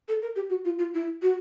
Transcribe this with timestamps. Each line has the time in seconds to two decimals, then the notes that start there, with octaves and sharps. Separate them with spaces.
0.08 A4
0.22 A#4
0.36 G4
0.50 F#4
0.65 F4
0.79 F4
0.94 E4
1.22 F#4